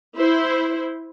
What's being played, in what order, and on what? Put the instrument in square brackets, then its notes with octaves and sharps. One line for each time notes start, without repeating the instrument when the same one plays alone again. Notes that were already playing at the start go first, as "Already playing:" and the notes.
[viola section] E4 C5